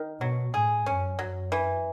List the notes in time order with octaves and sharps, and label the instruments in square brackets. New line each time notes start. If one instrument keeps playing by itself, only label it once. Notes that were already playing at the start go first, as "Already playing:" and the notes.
Already playing: [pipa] D#3
[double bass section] B2 [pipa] F#3
[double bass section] A2 [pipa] G#4
[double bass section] F#2 [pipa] C#4
[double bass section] F#2 [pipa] F#3
[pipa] E3